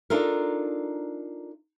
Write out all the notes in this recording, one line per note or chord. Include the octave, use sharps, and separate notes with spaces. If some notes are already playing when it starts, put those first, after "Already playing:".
D4 D#4 F4 A4 A#4